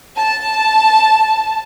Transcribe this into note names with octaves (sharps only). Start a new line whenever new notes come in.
A5